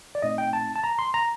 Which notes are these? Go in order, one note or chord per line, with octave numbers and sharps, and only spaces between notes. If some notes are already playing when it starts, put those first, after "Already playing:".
D5
A#2 A3 C4 D#4 D#5
G5
A5
A5
A#5
C6
A#5